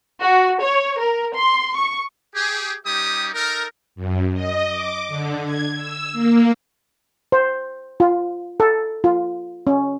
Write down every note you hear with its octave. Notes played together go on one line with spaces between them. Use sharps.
F#4
C#5
A#4
C6
C#6
G4 G#4
G3 C#4 D#4 G4 D#6
D#4 A4 A#4
F#2
D#5
D6
D3
G#6
E6
A#3
C5
F4
A4
F4
C#4